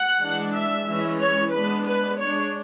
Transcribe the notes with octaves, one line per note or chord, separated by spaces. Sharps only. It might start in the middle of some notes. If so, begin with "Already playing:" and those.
Already playing: F#5
E3 G#3 D4
E5
E3 G#3 C#4
C#5
G#3 B3 D4 B4
B4
G#3 D4 C#5